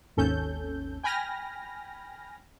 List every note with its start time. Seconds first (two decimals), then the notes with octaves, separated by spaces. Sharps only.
0.17 G#1 D#2 C#4 A4 G6
1.03 G5 G#5 B5 F6 A#6